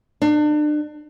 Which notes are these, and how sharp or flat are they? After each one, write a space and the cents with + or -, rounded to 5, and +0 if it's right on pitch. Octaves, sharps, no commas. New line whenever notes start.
D4 +35